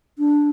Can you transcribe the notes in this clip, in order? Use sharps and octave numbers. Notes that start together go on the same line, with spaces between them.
D4